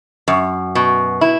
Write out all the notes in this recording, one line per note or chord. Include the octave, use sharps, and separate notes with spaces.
F#2
B2
E4